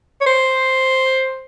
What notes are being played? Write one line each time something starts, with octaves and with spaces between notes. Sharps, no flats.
C#5
C5